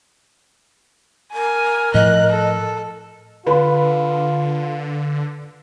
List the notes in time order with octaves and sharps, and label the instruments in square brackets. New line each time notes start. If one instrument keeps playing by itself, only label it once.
[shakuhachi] A#4 [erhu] G#5
[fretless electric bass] A2 F3 [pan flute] D#5 [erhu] F#6
[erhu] A4
[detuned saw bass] D3 [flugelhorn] F4 [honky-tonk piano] B4 B5